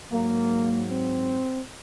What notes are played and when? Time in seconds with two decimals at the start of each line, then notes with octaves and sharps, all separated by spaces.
0.11 G#2 F#3 A#3
0.89 C4